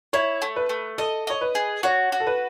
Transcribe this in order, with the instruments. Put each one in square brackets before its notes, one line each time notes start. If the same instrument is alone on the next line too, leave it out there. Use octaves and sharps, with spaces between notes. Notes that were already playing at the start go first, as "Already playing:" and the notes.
[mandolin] E4 [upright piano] C#5
[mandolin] A3
[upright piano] B4
[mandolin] A3
[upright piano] A4 [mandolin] D#5
[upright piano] C#5 [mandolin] D#5
[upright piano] B4
[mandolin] G#4
[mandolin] F#4 [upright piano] C#5
[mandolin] F#4
[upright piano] A4
B4